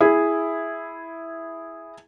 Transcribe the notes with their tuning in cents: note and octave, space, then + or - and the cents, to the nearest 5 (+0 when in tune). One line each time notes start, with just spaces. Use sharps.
E4 +0 G#4 -5